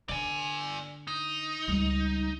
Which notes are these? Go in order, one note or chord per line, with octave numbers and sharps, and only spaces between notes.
D3 D5 G#5
D#4
C#2 G3